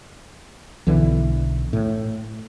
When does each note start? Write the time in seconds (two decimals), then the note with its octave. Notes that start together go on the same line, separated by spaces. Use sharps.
0.86 B1 D3 E3
1.73 A2